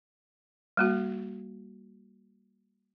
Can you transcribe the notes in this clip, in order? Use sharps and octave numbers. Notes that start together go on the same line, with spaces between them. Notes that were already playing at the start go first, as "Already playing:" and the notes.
G3 A#3 F#4